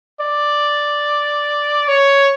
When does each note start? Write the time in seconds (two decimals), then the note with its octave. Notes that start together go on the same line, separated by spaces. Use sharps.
0.20 D5
1.88 C#5